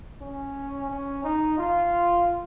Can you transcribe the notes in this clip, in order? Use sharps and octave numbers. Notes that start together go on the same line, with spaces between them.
C#4
C#4
D#4
F4